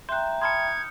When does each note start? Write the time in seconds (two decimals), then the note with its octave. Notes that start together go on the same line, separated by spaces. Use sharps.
0.09 E5 G5 A#5 C6 F#6 G6
0.42 A5 B5 C6 D#6 F6 G#6 C#7